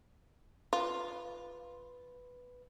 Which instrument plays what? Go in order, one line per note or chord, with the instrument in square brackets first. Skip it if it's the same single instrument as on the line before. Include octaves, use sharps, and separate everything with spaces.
[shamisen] F4 [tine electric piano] B4